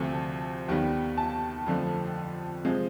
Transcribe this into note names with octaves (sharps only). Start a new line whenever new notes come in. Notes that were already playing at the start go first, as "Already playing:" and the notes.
Already playing: D2 C3 F3 A3 C4 A5
D#2 D#3 G3 B3
A5
F2 D3 F3 A3
C3 F3 G#3 C4